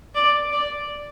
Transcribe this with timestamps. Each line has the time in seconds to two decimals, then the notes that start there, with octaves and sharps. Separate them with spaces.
0.15 D5
0.52 D5